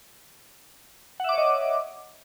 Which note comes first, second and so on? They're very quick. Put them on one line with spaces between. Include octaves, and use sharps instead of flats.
F#5 E5 D6 C#5 D#5